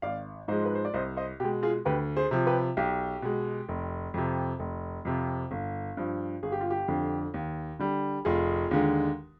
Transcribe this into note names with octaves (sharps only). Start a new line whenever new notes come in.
G#1 D5 F5
G#2 F3 G#3 C5 D#5
B4
C5
D5
C2 C5 D#5
C5 D#5
B2 G#3 G4
F4 G#4
D2 G4 B4
G#4 C5
C3 F3
G4 B4
B1 G4
B2 G#3
F1
F2 C3
F1
F2 C3
G1
G2 F3
G1 G#4
G4
F4
G4
F2 D3
D#2
D3 G3
F1 F4 G#4
D#2 D3 G#3